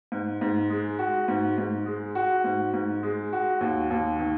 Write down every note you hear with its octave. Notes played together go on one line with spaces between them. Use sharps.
G#2
G#2
G#3
F#4
G#2
G#2
G#3
F#4
G#2
G#2
G#3
F#4
D#2
D#2
D#3